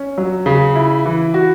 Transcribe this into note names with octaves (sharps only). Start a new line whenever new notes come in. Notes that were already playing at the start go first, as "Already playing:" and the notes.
Already playing: C#4
F#3
C#3
E4
E3
F#4